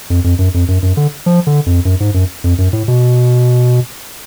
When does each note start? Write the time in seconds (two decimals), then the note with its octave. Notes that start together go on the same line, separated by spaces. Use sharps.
0.10 F2
0.24 F2
0.39 F#2
0.54 F2
0.68 F#2
0.83 F#2
0.97 D3
1.26 F3
1.47 D3
1.66 F2
1.85 F#2
2.00 G#2
2.14 F#2
2.44 F2
2.58 F#2
2.73 A2
2.88 B2